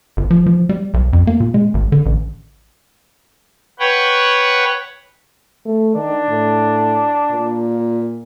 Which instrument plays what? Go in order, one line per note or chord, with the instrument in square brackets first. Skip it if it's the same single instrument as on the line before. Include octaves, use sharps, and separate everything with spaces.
[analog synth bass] G1
F3
F3
G3
B1
F2
A#3
A#2
G#3
G#1
D3
A1
[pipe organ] B4 C#5 F#5 G5
[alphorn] A3
[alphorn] D#3 [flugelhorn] D4
[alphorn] A2
A#2